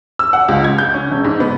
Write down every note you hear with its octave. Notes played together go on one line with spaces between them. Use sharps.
E6
F#5
C#2
G#6
G6
C#4
E1
G#2
B3